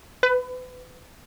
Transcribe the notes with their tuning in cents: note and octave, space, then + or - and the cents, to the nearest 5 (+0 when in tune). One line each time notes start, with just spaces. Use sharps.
B4 +30